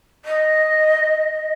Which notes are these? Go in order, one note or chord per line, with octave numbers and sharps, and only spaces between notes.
D#5